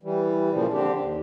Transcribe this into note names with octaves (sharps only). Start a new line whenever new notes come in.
E3 G3
A#2 C#3 F3
D3 C4 D4 G4
D#2